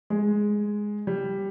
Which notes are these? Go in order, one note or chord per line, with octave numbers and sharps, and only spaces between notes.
G#3
G3